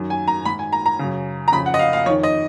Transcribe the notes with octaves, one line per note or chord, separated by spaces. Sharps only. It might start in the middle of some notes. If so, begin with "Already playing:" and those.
Already playing: F#2 D#3
G#5
A#5
G#2 D#3 B5
G#5
A#5
A#5
F#2 C#3
A#5
F2 C#3 B5
F#5
D#5
F5
F5
F2 D#3 C#5
D#5